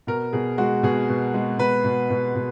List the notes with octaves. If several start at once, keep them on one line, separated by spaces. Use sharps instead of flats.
B2 A#4
B2 G#4
G#3 F#4
B2 G#4
B2
G#3
B2 B4
B2
B2
B2